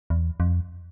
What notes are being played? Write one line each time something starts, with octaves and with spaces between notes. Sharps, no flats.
E2
F2